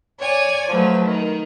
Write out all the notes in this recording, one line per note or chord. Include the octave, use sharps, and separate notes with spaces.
C#5 D5 G#5
F3 F#3 A3 B4
D#3